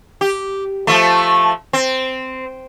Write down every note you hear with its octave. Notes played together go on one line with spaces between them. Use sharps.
G4
F3 A3
C4